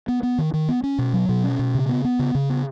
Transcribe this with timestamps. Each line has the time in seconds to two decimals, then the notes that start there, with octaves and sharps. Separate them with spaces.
0.08 B3
0.23 B3
0.38 D#3
0.53 D#3
0.69 B3
0.83 C#4
0.98 B2
1.13 F#3
1.29 B2
1.44 C#4
1.59 B2
1.75 C#3
1.89 B3
2.04 B3
2.19 C#3
2.35 C#3
2.50 B3